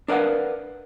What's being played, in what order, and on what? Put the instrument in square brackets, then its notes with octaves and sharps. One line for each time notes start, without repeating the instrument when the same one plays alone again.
[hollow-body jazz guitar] D4 A#4 B4 F5 F#5